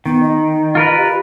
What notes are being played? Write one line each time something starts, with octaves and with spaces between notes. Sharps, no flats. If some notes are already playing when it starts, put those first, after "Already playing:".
D#3 B3
D#5
F4 A#4 B4
G4